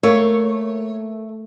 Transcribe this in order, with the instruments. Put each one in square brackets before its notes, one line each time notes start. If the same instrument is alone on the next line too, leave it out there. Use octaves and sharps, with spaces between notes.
[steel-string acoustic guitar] A3 [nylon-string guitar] A#3 [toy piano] A#4 [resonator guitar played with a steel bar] C#5